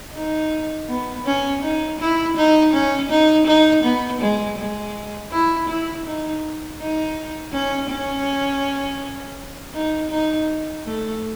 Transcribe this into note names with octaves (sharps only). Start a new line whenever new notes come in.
D#4
B3
C#4
D#4
E4
D#4
C#4
D#4
D#4
B3
G#3
G#3
E4
E4
D#4
D#4
C#4
C#4
D#4
D#4
A3